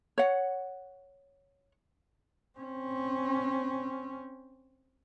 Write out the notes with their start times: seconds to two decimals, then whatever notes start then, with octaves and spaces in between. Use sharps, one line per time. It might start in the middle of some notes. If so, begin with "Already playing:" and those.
0.18 C#5 F#5
2.59 C4 C#4